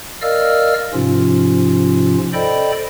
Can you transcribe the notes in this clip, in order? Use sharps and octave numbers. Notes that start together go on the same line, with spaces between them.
A#4 D5 D#5 F5 E6 F6
G#2 C3 F3 C#4 F4
A4 C5 D5 D#5 G5 B5